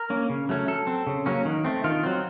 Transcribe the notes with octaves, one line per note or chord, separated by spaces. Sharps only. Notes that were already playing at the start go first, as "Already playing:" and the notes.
Already playing: A#4
A#3 C#4
C#3
F#3 A3 C#4
F#3 A4
C4
C#3
F#3 A#3 C#4
D#3
A3 C4
D#3 F4
F#3 C4